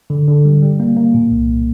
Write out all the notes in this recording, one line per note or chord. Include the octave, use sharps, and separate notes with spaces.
D3
D3
G3
G3
A#3
A#3
A#2
C2